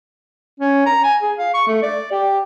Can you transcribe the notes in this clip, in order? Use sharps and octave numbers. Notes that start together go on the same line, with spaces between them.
C#4
A#5
G#5
G#4
F5
C#6
A3
D5
G4